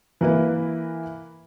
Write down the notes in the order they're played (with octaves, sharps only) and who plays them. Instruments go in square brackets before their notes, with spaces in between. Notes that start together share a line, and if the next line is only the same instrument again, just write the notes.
[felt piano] E3 A#3 E4 B4